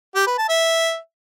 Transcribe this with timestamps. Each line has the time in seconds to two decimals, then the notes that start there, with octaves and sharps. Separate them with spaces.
0.15 G4
0.27 B4
0.38 A5
0.49 E5